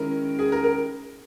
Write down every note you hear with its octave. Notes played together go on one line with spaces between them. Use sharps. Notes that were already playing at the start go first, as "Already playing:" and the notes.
Already playing: D#3 G#3 C#4 E4 A#4
G#4
A#4
A#4